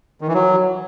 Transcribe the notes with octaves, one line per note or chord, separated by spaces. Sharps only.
D#3
E3
F#3